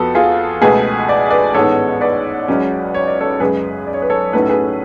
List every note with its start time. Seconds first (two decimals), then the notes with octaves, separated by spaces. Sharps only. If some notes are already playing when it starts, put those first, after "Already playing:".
Already playing: F2 F3 B3 F#4 A4
0.15 F4 G#4
0.61 C#2 B2 A3 G#4 B4
1.09 D5
1.30 B4 D5
1.54 A1 G#2 G#3 B3 A4 C#5
2.01 B4 D5
2.48 C#2 C#3 F#3 C#4
2.94 C#5
3.07 D5
3.20 A4 C#5
3.40 F#2 C#3 G#3 G#4 B4
3.87 D5
3.94 C#5
4.02 B4
4.10 A4 C#5
4.33 B1 A2 F#3 A3 C#4 B4
4.42 A4
4.49 G#4 B4